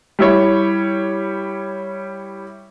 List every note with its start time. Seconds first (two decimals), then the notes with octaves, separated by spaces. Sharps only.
0.19 G3 E4 C#5